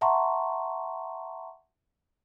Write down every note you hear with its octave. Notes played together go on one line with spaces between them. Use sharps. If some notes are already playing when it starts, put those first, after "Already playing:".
E5 F#5 A5 A#5 C6 C#6